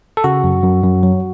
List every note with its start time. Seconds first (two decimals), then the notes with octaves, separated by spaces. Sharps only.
0.17 A4
0.24 C#3 F#4
0.44 F#2
0.64 F#2
0.84 F#2
1.03 F#3